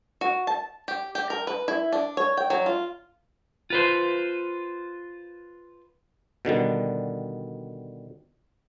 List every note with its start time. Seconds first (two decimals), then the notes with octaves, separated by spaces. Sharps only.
0.21 F#4
0.47 A5
0.88 G4
1.15 G4
1.30 A#4
1.47 B4
1.68 E4
1.92 D4
2.17 C#5
2.37 G5
2.50 F#3
2.66 F4
3.70 F4 B4 C5
6.45 B2 D3 D#3 G3